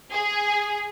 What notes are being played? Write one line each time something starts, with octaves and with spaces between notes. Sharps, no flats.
G#4